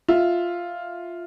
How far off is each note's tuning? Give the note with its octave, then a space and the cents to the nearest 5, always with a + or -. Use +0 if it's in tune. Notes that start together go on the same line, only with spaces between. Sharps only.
F4 +0 E5 +0